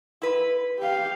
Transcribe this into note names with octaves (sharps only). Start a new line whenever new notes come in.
E4 B4
G4 F5